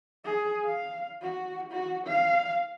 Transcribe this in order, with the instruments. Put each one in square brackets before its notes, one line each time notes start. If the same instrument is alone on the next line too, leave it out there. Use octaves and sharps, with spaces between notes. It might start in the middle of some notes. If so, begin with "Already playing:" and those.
[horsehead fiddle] G#4
F5
F#4
F#4
F5